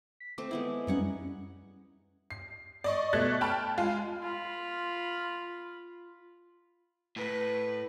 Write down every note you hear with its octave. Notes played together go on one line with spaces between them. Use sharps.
B6
A3 C4 C5 D6
G#3 B3 E4
F#2 G3 C#4 D#4 C#5 F#5
C7
D5 D#5 C#6
B2 A3 C#6 F#6 G#6 A6
G5 A5 B5 F6
G#3 F4
F4 B5
A2 B4